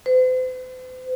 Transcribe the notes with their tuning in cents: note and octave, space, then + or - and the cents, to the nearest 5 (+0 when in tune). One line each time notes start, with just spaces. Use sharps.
C5 -45